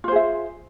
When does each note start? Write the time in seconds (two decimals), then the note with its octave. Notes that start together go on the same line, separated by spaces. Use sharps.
0.04 F4
0.08 C5
0.12 G#4
0.16 E5